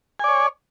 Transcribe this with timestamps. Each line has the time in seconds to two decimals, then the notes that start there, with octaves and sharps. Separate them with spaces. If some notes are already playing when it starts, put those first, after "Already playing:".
0.20 G#5
0.24 D5
0.28 C#5